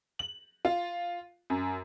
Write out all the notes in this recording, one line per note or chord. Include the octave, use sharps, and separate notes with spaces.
F#7
F4
F#2